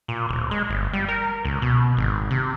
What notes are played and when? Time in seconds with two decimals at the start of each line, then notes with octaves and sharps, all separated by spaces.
0.08 A#2
0.29 D1
0.51 G#3
0.69 G1
0.93 G3
1.08 A#4
1.45 C#2
1.62 B2
1.97 G#1
2.31 C3